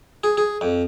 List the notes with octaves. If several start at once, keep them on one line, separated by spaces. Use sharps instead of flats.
G#4
G#4
F2